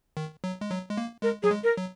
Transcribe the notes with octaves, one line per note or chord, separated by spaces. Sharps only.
D#3
F#3
G#3
F#3
G#3
A#3
G#3 A#4
F#3 G#4
G#3
A#4
F#3